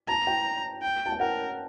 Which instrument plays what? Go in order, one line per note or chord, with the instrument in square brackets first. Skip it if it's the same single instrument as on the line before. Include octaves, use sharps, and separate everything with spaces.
[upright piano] A5 [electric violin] A#5
[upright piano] G5
[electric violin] G5
[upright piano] A5
G5
[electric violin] A#4 [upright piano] F#5